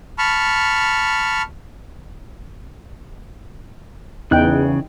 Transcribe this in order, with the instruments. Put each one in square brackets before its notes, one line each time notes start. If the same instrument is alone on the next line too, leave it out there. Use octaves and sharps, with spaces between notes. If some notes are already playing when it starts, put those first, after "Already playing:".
[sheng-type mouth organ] A5 B5 C#6 F6
[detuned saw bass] E2 [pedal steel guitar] C#3 F#6 [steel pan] D#4 G5